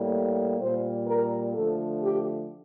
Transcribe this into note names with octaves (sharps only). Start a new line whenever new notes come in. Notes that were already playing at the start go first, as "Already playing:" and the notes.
Already playing: A2 G3 A#3
A#2 G3 A#3 C5
A#4
D3 F3 A3 A4
G4